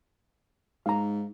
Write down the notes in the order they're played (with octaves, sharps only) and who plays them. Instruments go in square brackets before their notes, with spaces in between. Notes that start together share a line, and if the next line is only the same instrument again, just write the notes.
[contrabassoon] G#2 [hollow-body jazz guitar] F5 A#5